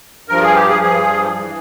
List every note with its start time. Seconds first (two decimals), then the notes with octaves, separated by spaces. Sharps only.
0.28 G2 F3 A#4
0.42 G#4
0.55 G4
0.69 G#4
0.83 G2 F3 G#4
1.39 E3